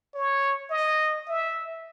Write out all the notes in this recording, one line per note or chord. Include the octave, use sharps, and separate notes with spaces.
C#5
D#5
E5